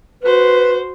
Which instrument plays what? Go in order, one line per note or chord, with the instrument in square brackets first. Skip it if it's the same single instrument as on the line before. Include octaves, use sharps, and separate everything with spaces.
[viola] F#4 C5 [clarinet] B4